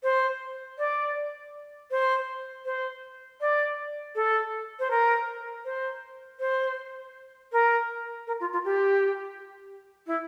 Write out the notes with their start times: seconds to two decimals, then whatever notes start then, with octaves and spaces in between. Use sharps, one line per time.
0.03 C5
0.78 D5
1.91 C5
2.65 C5
3.40 D5
4.15 A4
4.79 C5
4.90 A#4
5.65 C5
6.40 C5
7.52 A#4
8.27 A#4
8.40 F4
8.52 F4
8.64 G4
10.07 E4